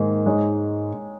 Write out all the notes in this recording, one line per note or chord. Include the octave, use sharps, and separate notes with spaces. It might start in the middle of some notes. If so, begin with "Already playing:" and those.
Already playing: G#2 D#3 A#3 G#4
G#3 D#4 G#4 C#5